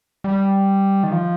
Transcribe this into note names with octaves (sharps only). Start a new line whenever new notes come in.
G3
D#3
F3